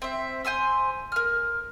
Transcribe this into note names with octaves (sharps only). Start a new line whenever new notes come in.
C4 E5
C5 G#5 C6 E6
A#4 F6